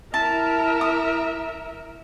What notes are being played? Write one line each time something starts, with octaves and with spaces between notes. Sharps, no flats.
E4 A#4 E5 A5
D#6